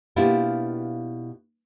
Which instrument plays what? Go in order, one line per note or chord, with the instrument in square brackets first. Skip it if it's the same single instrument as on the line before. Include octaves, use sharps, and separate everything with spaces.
[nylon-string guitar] B2 A#3 D4 E4 F4 G4